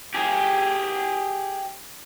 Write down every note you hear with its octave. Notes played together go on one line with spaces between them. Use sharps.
G4 G#4